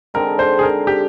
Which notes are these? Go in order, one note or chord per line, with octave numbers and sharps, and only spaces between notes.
D3 G#3 C4 D#4 A#4
C5
G#4
A#4
G4